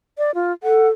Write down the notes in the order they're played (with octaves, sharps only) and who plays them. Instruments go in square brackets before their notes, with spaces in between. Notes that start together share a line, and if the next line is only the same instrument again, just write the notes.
[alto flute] D5
F4
[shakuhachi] A4 [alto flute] F#5